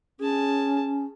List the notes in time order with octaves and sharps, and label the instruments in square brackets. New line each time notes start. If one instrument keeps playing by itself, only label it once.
[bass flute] C#4 [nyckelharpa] G#4 A5